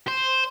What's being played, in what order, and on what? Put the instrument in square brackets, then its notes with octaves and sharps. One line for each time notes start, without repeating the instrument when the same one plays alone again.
[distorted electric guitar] C5